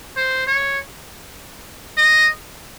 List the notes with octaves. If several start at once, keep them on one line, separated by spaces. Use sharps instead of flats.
C5
C#5
D#5